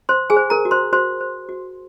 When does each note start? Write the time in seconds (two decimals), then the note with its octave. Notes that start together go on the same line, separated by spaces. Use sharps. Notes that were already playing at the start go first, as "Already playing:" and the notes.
0.09 C5 C6
0.30 G#4 G#5
0.36 C5
0.50 A#4 A#5
0.65 F#4
0.71 C5 C6
0.93 F#4 C5 C6
1.21 C5
1.49 F#4